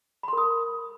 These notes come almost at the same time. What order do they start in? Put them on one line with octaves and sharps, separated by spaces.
B5 C6 A#4 D#6